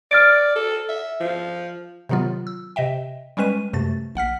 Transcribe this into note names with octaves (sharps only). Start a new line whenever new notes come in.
D5 F6 A6 D7
A4
E5
F3
C3 D#3 F#3 B3 F4
E6
C3 D#5 E5 G5
G3 G#3 C#4 B4 D#7
F#2 C3 A3 A6
A#1 F#5 F6 B6